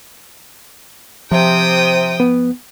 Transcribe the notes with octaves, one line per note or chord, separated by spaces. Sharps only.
C3 F3 G5 D#6
B3